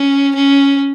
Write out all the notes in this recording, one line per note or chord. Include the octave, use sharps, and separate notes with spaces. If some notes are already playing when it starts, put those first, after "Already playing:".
Already playing: C#4
C#4